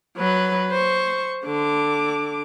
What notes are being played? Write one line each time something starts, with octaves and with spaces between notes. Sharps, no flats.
F#3 B4
C5 C#6
D3 D6